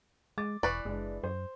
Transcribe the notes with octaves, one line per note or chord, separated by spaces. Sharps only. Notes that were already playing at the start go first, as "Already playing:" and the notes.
G#3 D6 A6
E1 E3 B4 D5 C#6
F#1 G#3 D4
F#2 C5